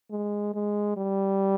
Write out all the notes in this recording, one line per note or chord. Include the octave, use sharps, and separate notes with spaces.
G#3
G#3
G3